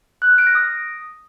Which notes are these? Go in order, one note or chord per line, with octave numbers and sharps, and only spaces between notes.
F#6
F6
D7
A#6
D#6